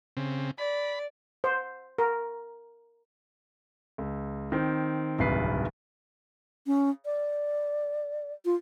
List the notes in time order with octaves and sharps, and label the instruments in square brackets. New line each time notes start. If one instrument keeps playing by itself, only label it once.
[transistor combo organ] C#3 C4
[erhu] D5 [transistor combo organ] B5
[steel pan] C5
A#4
[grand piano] C#2
D#3 C4
D1 G1 C2 D#3 B4 C7
[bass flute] C#4
D5
F4